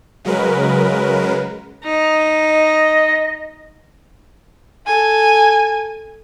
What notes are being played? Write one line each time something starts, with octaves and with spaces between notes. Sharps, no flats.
C#3 F#3 G#3 A#4 B4
D#4
D#5
A4 G#5